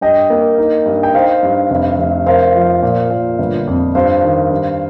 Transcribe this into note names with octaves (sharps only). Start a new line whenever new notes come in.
G2 D#5 G5
A#3
D#4
G2
G5
D#4 C5 F5
G2
F1
F1
A#4 C5 F5
F3
A#2
A#2
G1
F2
G2 C5 F5
D#3
G2